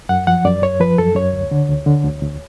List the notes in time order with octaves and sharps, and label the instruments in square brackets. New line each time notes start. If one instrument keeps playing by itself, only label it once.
[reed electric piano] F#2 F#5
F3 F#5
F#2 D5
F#2 C#5
F3 B4
F#2 A4
F#2 C#5
D2
D3
D2
D3
D2
D2